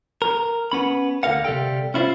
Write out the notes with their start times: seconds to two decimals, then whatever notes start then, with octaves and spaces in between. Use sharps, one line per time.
0.22 A#4
0.72 B3 C#4 B5
1.23 D2 D3 F4 A#4 F5 F#5
1.45 C3 G3 A4 G5
1.94 C#4 E4 F4 B4 C5